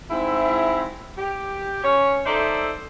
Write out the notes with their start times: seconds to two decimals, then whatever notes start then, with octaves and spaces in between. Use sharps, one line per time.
0.10 G#2 C4 E4
1.17 G4
1.84 C#4 C#5
2.26 D#4 A4 C5 D5 E5